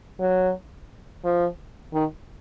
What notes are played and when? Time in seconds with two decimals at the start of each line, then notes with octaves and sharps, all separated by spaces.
0.20 F#3
1.25 F3
1.94 D#3